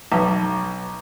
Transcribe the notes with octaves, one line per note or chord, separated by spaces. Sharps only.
B1